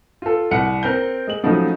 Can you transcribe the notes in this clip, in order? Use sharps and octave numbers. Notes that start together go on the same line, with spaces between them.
F4 A4
C2 F#5 C#7
C4 A#4 G6
G#3 F#7
C#3 F3 F#3 A3 D#4